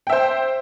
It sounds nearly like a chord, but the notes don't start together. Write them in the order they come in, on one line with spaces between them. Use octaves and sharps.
G5 E5 C5